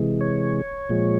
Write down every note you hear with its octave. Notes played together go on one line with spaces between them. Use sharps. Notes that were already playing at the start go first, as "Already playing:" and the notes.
Already playing: C3 E3 G#3
C#5
A#2 F3 G#3